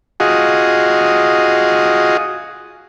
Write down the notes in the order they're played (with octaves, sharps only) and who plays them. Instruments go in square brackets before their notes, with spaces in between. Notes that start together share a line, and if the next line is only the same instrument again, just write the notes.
[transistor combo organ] F4 F#4 G#4 D#5